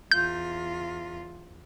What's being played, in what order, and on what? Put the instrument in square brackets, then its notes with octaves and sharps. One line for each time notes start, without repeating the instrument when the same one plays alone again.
[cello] E2 F4 [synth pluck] G6